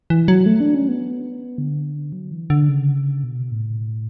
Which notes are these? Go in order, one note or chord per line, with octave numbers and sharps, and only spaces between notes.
E3
F#3
A3
D4
C#4
B3
D3
F#3
E3
D3
C#3
B2
A2